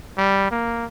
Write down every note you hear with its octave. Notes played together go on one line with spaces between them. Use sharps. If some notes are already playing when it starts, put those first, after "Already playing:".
G3
A#3